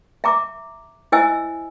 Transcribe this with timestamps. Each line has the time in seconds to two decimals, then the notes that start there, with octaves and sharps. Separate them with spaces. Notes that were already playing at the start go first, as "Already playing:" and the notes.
0.24 E5 A#5 D6
1.12 E4 C5 D#5 E5 G#5 E6